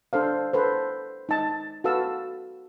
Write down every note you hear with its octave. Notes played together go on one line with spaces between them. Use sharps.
D4 A4 C5 F5
A4 B4 C5
D#4 A5
F#4 A4 B4 F5 A5 E6